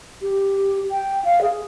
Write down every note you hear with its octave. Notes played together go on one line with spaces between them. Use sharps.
G4
G5
F5
G#4